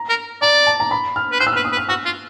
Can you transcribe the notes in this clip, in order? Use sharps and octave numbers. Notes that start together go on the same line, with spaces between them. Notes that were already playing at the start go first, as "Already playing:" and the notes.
Already playing: A#5
A#4
D5 A#5
A5
A#5
B5
F6
B4
C5 F#6
E6
B4 F6
D#6
B4
F6
F#4 E6
F4